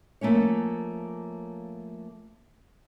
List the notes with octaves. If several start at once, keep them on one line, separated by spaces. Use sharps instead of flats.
F3 A3 A#3 C#4 C#5